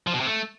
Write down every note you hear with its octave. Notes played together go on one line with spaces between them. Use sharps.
F3
B2
C3
A3